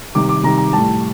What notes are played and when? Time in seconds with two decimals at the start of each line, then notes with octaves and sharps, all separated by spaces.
0.15 C3 D#3 G3 D6
0.29 D6
0.43 C3 D#3 G3 A#5
0.58 A#5
0.73 A2 G3 A5